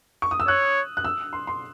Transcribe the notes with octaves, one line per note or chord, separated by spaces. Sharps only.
C#6
D#6
E6
C#5 F#6
F#6
E6
C6
C6